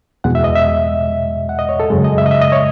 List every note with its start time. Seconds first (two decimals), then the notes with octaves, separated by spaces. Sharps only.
0.24 E2 B2 G#3 F#5
0.35 E5
0.44 D#5
0.56 E5
1.49 F#5
1.59 D#5
1.69 C#5
1.80 A4
1.90 F#2 C#3 G#3
2.04 D#5
2.18 E5
2.26 D#5
2.31 E5
2.42 D#5
2.52 C#5